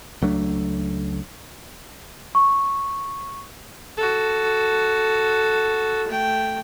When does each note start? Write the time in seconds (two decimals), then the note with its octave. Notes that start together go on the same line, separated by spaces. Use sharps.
0.22 C#2 F#3 A3 D4
2.35 C#6
3.97 F#4 A4
6.08 A3 G5